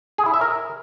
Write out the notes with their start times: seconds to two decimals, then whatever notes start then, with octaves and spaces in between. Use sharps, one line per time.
0.18 G#4
0.26 E4
0.34 E5
0.41 A#4